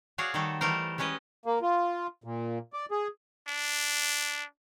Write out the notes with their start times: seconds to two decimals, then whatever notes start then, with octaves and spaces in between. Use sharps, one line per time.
0.18 F#4 G#4 C#5 D5 F5 F#5
0.34 D#3 G3 A3 F#4 A4
0.61 E3 G3 A3 A4 A#4 C5
0.98 G3 G#3 C#4 B4 D#5
1.46 A#3
1.62 F4
2.24 A#2
2.73 D5
2.91 G#4
3.48 D4